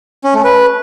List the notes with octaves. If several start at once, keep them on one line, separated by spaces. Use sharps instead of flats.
C#4
A3
B4